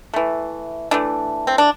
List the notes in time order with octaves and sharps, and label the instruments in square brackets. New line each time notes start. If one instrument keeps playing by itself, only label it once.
[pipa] E3 A3
E3 A3 D4
C4
D4